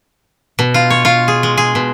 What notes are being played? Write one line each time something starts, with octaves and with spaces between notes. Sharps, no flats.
B2
F4
C#5
F4
G#4
G#3
G#4
B2